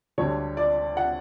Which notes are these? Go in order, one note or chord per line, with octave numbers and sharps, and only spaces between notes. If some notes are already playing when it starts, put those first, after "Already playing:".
D2 D3 G3 C#5
D5
F#5